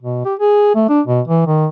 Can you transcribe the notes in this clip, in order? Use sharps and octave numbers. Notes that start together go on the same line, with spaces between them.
B2
G4
G#4
A3
D4
B2
E3
D#3